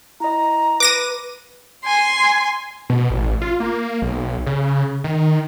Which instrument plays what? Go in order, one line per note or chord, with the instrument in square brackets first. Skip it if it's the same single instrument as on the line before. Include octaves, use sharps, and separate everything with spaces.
[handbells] E4 D#5 [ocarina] A#5
[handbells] B4 [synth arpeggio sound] D6 A#6 D#7
[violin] G#5 C6
[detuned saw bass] B2
A1
F4
A#3
B1
C#3
D#3